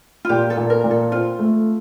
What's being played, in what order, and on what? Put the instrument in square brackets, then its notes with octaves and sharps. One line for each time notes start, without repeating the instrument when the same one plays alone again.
[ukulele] F4
[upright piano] A#2 [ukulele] G4
[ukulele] A4
[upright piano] A#2
[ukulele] A#4
[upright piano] A#2
[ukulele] A4
[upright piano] C4 [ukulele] F4
[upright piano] A3